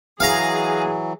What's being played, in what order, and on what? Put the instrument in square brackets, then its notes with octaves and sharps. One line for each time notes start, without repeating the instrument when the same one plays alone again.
[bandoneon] E3 F#3 [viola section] G#4 [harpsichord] F5 A#5